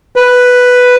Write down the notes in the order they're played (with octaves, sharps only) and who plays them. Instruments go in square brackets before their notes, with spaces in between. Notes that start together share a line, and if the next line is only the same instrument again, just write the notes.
[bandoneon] B4